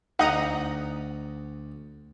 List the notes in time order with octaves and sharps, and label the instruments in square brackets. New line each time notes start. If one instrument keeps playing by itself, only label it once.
[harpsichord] D2 [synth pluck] D#4 D#5 A#5 [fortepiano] F#5